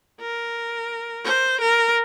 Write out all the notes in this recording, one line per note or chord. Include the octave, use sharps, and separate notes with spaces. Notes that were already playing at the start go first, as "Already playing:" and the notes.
A#4
C5
A#4